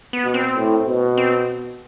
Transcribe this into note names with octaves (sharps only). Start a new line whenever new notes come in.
B3
B2
C4
A2
B2
C4